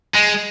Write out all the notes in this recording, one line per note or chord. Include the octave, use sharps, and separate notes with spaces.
G#3